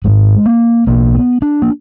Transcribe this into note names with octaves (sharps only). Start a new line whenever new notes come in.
G#1 G#2 G#3
A#3
B1 B2 A#3
B3
D4
A#3